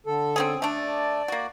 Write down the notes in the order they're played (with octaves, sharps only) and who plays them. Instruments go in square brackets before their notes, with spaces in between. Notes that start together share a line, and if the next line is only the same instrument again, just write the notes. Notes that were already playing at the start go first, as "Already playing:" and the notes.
[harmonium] D3 A4
[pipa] C4 C#4 G#4
[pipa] A3 D4 [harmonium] D5
[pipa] A#3 F#4